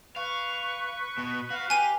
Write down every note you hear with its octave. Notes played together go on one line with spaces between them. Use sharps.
B4 F5 C#6
B2
F#4 F5
G4 B4 G#5 D#7